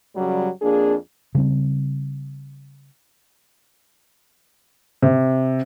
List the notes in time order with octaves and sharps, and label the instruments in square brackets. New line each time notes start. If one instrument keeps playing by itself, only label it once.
[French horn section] F#2 C#3 F#3 G3
F2 A#3 D4 G#4
[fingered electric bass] C#3 G3 C4
[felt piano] C3